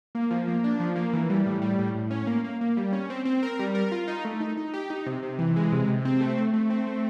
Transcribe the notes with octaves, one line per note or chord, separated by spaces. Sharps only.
A#3
F3
A#3
D4
F3
A#3
E3
G3
A2
G3
A2
A2
C#4
A#3
A#3
A#3
G3
C#4
C4
C4
A#4
G3
A#4
F4
D#4
A3
D#4
D#4
G4
D#4
C3
C3
E3
G#3
C3
C3
C4
A3
A3
A3
C4
A3